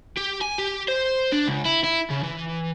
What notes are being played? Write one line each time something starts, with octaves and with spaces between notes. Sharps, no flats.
G4
G#5
G4
C5
D4
C#2
E4
E4
C#3
E3